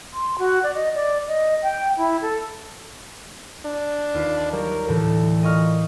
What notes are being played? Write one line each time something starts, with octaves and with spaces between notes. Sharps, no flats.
C6
F#4
D5
D#5
D5
D#5
G5
E4
A4
D4
D#2 F4 B4
F#3 G3 A#4
D2 A2 E3 A4
A#2 D#5 C#6 F6